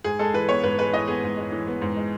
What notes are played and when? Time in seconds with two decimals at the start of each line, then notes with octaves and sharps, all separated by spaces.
0.04 G#2 G#4
0.19 G#3 A4
0.34 E3 B4
0.49 B3 C#5
0.63 G#2 B4
0.79 G#3 B4
0.93 E3 D#5
1.08 B3 G#4
1.23 G#2
1.37 G#3
1.52 E3
1.67 B3
1.82 G#2
1.97 G#3